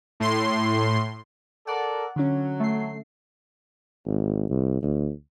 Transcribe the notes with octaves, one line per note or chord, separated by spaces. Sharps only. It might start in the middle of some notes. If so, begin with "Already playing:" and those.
A2 C6
A4 A#4 D5 F#5
D3 F#3 C#4
A3 C7
G#1
C2
D2